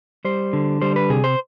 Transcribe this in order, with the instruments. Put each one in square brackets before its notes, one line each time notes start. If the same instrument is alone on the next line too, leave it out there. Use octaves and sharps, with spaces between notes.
[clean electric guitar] G3 C5
D3
G3 C5
B4
C3 G#4
C5